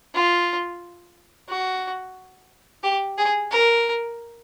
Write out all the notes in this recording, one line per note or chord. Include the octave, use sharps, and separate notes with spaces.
F4
F#4
G4
G#4
A#4